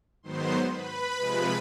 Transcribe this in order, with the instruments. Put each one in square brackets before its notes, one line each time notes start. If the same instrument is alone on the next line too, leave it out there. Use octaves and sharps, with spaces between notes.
[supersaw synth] G#2 D#3 F#3 B3 C5 C6
B4 B5
C3 F3 G#3